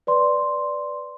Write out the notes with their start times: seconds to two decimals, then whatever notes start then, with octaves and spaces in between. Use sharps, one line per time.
0.07 B4 D5 C6